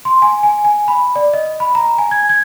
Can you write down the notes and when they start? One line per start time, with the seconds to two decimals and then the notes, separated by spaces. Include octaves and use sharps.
0.05 C6
0.22 G#5
0.43 G#5
0.64 G#5
0.88 B5
1.16 D5
1.34 D#5
1.60 B5
1.75 A#5
1.98 G#5
2.11 G#6
2.29 G#6